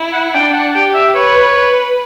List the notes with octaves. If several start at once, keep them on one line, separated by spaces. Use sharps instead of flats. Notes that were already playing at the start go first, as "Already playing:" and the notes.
Already playing: E4
F#5
D4 G5
F#5
G4 G5
E5
B4 C#5
B4